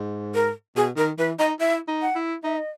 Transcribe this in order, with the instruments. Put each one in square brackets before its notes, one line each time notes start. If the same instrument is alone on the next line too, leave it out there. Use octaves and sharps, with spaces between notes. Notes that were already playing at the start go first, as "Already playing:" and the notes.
Already playing: [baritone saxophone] G#2
[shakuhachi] A#4
[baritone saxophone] B2 [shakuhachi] G#4
[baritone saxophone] D#3 [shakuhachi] A#4
[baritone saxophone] E3 [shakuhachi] B4
[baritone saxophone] D#4 [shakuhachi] D#5
[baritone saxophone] E4 [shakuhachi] E5
[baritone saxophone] D#4
[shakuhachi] F#5
[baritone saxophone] E4
[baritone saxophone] D#4 [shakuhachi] E5
[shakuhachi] D#5